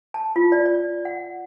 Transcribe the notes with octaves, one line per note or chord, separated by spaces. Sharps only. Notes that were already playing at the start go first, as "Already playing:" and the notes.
A5
F4
D5
D5
F#5